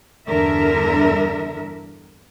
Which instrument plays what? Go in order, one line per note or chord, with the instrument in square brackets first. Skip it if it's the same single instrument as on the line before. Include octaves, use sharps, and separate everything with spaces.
[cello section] E2 G2 D3 A#4 E5